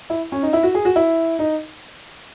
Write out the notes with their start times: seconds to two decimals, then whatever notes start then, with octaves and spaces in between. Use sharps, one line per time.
0.10 E4
0.32 C#4
0.43 D#4
0.53 E4
0.63 F#4
0.75 G#4
0.85 F#4
0.96 E4
1.39 D#4